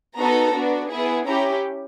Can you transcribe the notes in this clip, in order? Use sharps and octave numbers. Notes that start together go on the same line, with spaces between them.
B3 D#4 F#4 A4 A#5
B3 D4 F#4
B3 E4 G#4
C#4 E4 G4 A#5